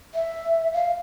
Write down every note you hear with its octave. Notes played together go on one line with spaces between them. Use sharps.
E5
F5